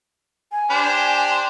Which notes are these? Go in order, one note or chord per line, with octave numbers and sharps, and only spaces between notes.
G#5
D4 G4 C5
C6